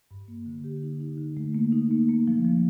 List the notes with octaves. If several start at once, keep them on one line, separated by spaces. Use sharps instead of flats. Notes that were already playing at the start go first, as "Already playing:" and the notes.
G2
A#3
D3
G4
D#4
D#4
D3
A3
A#3
D#4
A#3
A#3
F3
F3